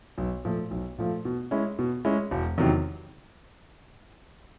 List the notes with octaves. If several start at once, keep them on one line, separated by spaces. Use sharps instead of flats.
B1
A#2 F3 A3
B1
A#2 F3 A3
B2
G#3 C#4 E4
B2
G#3 C#4 E4
E1
E2 C3 D#3 F#3